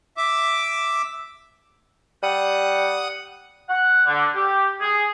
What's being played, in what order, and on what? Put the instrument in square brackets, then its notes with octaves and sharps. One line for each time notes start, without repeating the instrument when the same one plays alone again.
[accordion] E5 D6
[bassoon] G3 [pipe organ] F#5 D#6
[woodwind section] F#5
D3
G4
G#4